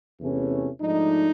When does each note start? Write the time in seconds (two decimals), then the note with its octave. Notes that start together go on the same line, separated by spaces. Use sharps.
0.19 E2 C3 E3 A3 C#4
0.80 G#2 F3 A3 D4 D#4